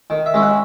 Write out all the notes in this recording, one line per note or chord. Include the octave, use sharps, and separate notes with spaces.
D#3
E5
G#3 C#4 E4
F#5